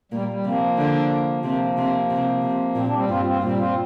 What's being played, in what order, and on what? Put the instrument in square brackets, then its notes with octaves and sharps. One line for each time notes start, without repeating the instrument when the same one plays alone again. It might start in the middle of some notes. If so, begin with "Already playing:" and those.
[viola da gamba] A#2 A#3 [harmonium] G3
[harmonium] G3
[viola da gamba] C3 C4 [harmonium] F3 A#3
[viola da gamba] D3 D4
[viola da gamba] C3 C4 [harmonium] F3 A#3
[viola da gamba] C3 C4
C3 C4
C3
[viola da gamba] A#2 [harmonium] C4
[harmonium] D4
G3 C4
[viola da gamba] G2 [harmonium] C4 F4
[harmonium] C4 F4
A#3
[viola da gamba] A#2 [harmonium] G3 C4
[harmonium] C4 F4